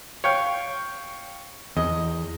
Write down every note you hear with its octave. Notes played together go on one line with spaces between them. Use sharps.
C#5 F5 G5
E2 D#5